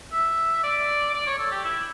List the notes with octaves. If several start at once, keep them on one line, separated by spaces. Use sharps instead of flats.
E5
D5
D5
C#5
A4
G4
E4